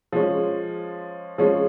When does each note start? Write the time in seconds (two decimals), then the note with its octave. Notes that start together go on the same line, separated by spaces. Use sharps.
0.12 F3 G#3 C#4
1.38 F3 G#3 C#4